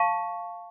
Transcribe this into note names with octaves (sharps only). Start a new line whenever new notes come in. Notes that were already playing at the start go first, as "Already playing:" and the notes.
Already playing: F5 A5 C#6